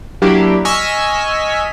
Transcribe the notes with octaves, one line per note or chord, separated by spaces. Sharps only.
F#3 A#3 D4 E4 G4
D#5 G#5 C#6 E6 F6 B6